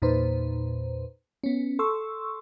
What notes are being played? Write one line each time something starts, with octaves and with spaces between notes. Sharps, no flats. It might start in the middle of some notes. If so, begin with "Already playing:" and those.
E2 A#2 D#4 B4 C5
B3 C#4
A4 C6 C#6 E6